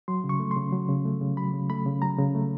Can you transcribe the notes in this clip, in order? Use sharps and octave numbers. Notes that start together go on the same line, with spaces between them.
F#3 C6
C#3
C#6
A3
C#3 C6
F#3
C#3
A3
C#3
F#3 B5
C#3
A3 B5
C#3
F#3 A#5
C#3
A3